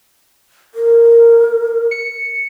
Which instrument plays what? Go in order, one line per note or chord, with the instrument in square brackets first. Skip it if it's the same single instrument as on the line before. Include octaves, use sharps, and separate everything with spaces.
[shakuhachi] A#4
[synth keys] C#7